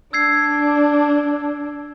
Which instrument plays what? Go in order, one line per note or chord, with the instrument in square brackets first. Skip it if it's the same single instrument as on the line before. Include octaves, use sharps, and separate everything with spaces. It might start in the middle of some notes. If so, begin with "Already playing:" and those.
[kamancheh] D4 [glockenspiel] E6 G#6 C7